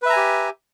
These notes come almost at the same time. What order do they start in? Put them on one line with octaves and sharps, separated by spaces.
B4 E5 A#5 G#5 G4